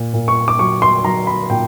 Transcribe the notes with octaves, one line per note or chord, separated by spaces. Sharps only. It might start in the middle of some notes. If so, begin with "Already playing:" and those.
Already playing: A#2
A#2
C#6
D6
F#3 C#6
C6
F#3 A#5
B5
A#2 G5